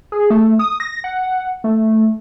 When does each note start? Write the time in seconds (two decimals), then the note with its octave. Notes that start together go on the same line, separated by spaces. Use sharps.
0.12 G#4
0.30 A3
0.59 D#6
0.80 A#6
1.04 F#5
1.64 A3